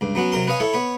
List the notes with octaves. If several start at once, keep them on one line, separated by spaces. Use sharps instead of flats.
C#2 G2
F#3 B3 C#4 F#4
C3 F#3 A#4 C6
B4 C#5 D#5 F5 G#5
E4 A4 C#5
B3 C#5 B5